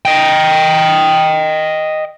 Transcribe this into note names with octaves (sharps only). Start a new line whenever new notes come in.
D#5 G5